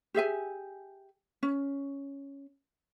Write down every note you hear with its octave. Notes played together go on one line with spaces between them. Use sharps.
G4 G#4 E5 G#5
C#4